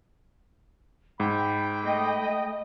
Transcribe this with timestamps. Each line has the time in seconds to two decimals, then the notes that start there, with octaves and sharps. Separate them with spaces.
1.20 G#2 G5 B5
1.84 A3 D#5